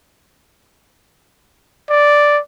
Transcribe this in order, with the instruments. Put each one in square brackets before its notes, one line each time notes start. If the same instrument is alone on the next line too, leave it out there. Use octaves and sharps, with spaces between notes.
[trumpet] D5